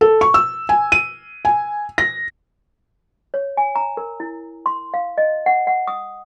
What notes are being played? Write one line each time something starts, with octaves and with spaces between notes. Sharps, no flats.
A4
C#6
E6
G#5
D#7
G#5
A#6
C#5
G#5
A#5
A#4
E4
C6
F5
D#5
F#5
F#5
D#6